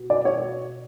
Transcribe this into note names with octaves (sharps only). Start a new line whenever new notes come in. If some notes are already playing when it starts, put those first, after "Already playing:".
Already playing: B2
D5
C#5